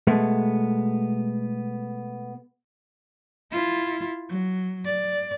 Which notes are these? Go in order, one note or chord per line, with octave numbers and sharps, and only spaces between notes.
B2 G#3 A3 B3
E4 F4
F#3
D5